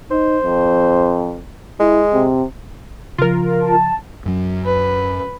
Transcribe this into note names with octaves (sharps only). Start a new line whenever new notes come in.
D#4 C5
F2
G#3 E4
C3
C#3 F3 F4 A#4
A5
F#2 F#3
B4